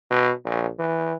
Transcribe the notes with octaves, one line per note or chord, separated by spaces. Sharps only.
B2
A#1
E3